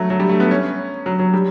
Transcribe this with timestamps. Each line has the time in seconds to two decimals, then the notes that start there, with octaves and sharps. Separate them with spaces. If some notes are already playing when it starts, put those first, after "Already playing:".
Already playing: F#3 A3
0.10 F#3
0.20 G3
0.29 A3
0.40 B3
0.51 C#4
1.06 F#3
1.19 F#3
1.34 G3